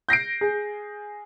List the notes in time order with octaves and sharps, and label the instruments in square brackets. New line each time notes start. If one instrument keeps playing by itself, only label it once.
[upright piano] G6 A#6 C7 D7
G#4